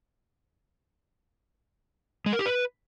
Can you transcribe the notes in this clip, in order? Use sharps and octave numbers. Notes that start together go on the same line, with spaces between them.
G#3
A#4
G4
B4